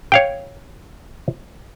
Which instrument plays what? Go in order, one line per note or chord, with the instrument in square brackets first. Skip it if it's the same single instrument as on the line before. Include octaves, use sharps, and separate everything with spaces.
[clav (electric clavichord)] C#5 F5 G5